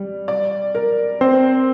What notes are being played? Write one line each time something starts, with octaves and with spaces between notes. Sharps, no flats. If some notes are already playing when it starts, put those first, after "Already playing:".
Already playing: G3 D5
D5
A#4
C4 C5